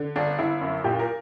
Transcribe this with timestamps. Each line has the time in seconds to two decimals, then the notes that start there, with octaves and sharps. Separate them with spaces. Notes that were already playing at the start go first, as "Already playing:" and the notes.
Already playing: D3
0.16 G1 D4
0.39 G1 E4
0.61 F#2
0.84 A#2 G4
0.99 A#4